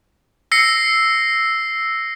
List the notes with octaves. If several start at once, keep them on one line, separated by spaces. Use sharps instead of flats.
E6 A#6 C7 C#7